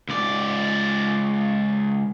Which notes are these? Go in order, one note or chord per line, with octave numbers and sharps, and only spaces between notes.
C#2 D5